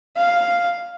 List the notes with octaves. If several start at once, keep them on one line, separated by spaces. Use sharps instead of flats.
F5